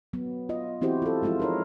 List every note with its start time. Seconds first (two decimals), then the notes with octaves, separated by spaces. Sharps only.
0.13 F#3 B3
0.49 F4 D#5
0.81 E3 C4 E4 F#4 G4 C5
1.02 F4 A4
1.22 F3 G#3 E4 F4
1.40 D#4 A#4 C#5